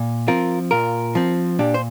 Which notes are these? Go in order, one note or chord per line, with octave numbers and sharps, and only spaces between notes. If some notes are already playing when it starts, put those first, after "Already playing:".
Already playing: A#2
F3 C4 F4 A#4
A#2 F4 A#4
F3 C4
A#2 D4 G4
C5